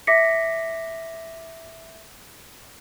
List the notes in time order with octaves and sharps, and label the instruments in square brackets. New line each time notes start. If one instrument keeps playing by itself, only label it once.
[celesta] E5 D6 A#6 B6 C#7